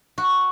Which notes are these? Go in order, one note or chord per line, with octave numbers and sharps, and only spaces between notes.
F#4